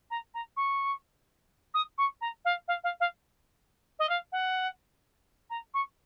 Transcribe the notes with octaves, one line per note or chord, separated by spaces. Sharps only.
A#5
A#5
C#6
D#6
C#6
A#5
F5
F5
F5
F5
D#5
F5
F#5
A#5
C#6